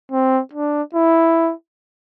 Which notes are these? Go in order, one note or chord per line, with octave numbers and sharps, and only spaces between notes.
C4
D4
E4